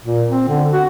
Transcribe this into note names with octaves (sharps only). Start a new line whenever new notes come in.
A#2
C4
D3
F#4